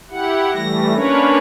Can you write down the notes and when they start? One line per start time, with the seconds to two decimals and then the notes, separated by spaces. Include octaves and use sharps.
0.10 E4 G4 F#5
0.53 E3 G3 A3 A#6
0.94 A#3 C#4 D4 A#4 B4 C#5